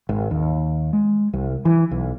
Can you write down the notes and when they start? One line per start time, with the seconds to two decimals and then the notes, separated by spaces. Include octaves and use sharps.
0.09 G#1
0.31 D#2
0.93 G#3
1.33 C2
1.65 E3
1.91 B1